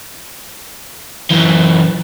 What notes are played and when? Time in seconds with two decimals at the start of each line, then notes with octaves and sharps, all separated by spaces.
1.31 F#2 E3